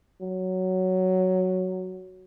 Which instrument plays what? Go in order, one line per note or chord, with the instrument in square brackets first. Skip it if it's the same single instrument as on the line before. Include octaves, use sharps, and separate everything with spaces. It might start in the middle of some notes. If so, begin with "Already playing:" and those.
[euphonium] F#3